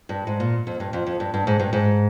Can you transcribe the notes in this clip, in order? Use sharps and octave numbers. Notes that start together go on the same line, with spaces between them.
G2
G#2
A#2
F2
G2
F2
F2
G2
G2
G#2
G2
G#2